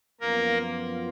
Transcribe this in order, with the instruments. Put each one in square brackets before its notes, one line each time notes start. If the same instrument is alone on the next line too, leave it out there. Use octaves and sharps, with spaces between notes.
[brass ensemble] F#2 F3 B3 F4 [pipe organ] A#3 A#4